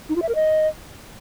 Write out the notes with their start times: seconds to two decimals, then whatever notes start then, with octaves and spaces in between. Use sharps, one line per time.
0.09 D#4
0.16 F4
0.22 E5
0.29 A#4
0.35 D#5